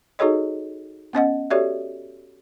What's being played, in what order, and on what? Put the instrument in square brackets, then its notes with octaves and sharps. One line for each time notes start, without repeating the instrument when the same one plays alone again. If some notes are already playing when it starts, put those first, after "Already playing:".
[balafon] D#4 F#4 G#4 A4 C#5 D#5
B3 C#4 D#5 F#5
F#4 G4 A4 C#5 D5 E5